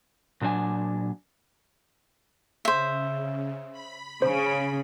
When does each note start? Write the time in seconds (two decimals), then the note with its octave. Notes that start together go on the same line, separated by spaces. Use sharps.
0.41 A#2 F#3 D4 C5 G#5
2.65 C#3 C5 E5
3.72 B5
4.22 C#3 C5